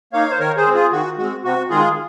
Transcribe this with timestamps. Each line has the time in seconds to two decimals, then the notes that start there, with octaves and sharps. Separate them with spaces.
0.13 A#3 D#4 C#5 F5
0.31 C5
0.39 D#3 A#4 C#5
0.57 G#4 C5
0.66 G#3 C4
0.74 F4 G#4
0.92 D#3 F#4
1.18 G#3 C4 F#4
1.44 C3 F#4
1.70 D#3 G#3 F4 G#4